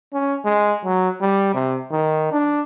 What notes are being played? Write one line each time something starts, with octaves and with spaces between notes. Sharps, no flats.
C#4
G#3
F#3
G3
C3
D#3
D4